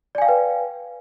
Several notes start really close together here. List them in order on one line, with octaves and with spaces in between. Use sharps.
D5 G#5 F5 G5 B4